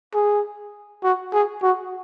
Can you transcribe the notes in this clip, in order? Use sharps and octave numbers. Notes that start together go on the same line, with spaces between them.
G#4
F#4
G#4
F#4